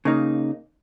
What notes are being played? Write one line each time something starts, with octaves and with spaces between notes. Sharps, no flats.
C#3 A#3 D#4